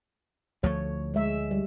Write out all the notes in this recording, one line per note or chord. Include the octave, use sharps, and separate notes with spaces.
D2 F3 A3 C#5
G#3 E5
G3